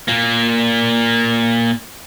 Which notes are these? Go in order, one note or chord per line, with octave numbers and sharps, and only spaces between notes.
A#2 A#3